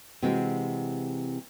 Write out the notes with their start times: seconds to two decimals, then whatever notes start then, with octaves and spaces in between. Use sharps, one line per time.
0.22 C3 E3 G#3 C4 F#4